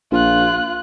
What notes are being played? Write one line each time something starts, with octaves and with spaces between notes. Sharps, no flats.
A#1 F4 F#6